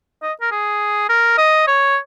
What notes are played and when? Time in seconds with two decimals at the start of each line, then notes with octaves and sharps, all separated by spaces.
0.22 D#5
0.41 A#4
0.52 G#4
1.09 A#4
1.38 D#5
1.67 C#5